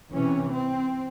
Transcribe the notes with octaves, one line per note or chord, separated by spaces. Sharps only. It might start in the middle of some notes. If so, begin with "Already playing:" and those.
C3 E3 C#4
C4